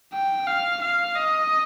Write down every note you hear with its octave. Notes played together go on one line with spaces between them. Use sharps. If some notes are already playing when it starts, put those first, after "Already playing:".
G5
F5
F5
D#5